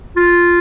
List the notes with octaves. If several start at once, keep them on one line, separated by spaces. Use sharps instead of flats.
F4